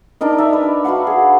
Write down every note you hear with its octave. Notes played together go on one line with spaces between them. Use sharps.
D4 D#4 A#4 D#5
E5 A5 A#5
B4
F#4 B4 F5 F#5
G#4